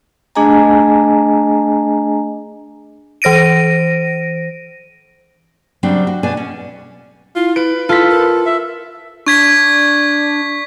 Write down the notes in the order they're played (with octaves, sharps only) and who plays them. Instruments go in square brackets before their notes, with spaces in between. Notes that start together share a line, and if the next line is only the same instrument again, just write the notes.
[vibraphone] A3 D4 G#4 D#5 G#5 A#5
[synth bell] E3 C5 A#6 D7 D#7
[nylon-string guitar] C#3 F#3 G3 C4 D4
F#4
B2 D4 G#5
C#4
[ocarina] E4 [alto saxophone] F4
[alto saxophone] B4 [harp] D7
[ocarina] E4 [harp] F4 B6 [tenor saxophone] A4
[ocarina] A#4
[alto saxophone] E5
[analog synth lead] D4 [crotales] C#6 G#6 B6